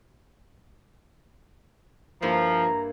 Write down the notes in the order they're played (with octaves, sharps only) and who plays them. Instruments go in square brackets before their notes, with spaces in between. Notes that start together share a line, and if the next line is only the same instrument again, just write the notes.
[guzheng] G2 A#3 E4 [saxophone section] F3 [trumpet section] A#5